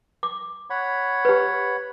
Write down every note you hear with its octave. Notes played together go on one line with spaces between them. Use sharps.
D6
C#5 F#5 B5
G4 B4